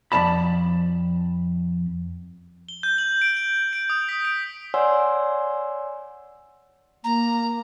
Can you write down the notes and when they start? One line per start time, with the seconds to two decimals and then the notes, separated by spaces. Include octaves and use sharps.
0.12 F2 C4 D5 A5 B5
2.69 G7
2.83 G6
2.98 F#7
3.22 D7
3.37 D7
3.73 D7
3.90 D#6
4.09 B6
4.25 D7
4.74 C#5 D5 F#5 G#5 C6 E6
7.04 A#3 A#5